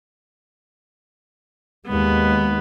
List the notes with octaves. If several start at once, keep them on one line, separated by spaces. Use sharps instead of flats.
D#2 G#3 B3